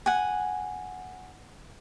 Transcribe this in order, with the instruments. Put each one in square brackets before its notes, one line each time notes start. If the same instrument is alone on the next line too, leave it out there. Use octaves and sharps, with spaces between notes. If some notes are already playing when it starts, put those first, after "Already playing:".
[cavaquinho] F#5 G#5